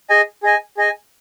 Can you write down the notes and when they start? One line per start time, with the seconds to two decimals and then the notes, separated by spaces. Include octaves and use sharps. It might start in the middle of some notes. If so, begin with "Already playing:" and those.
0.10 G#4 D#5 G#5
0.43 G#4 D#5 G#5
0.77 G#4 D#5 G#5